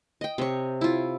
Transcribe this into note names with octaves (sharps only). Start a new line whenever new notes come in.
D#5 G5
C3 C#5
E4 F4